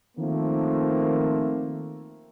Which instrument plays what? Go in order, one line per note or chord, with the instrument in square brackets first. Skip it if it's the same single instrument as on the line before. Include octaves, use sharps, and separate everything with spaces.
[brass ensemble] D#3 F3 A3 A#3 C4